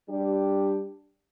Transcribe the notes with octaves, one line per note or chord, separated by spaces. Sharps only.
G3 D4 G4